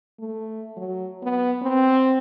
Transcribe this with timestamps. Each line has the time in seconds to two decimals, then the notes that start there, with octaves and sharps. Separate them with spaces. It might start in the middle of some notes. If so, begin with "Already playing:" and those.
0.20 A3
0.77 F#3
1.23 B3
1.62 C4